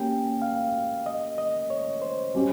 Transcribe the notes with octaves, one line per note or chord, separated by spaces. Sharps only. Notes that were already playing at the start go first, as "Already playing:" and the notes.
Already playing: A#3 C#4 G4 A#4 G5
F5
D#5
D#5
C#5
C5
G3 C#4 G4